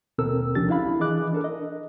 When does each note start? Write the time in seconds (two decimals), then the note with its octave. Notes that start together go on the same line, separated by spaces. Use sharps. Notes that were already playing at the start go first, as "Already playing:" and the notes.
0.18 D#2 B2 C4 A4 A#4 E6
0.55 C2 F3 C#4 D4 G4 A6
0.69 D4 E4 F5 B5
1.00 E3 G#4 D#5 D6 F#6
1.33 D4 A4 A#4
1.44 D#5